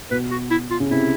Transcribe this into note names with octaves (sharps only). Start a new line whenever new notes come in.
B2 B4
F#4
E4
F4
C#3
C3 E4